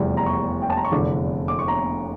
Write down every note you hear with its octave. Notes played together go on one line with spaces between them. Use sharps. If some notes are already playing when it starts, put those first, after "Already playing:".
Already playing: F1 E2 E3 G3
A#5
C#6
G5
A5
A#5
C#6
F1 E2 D3 D6
D6
C#6
A#5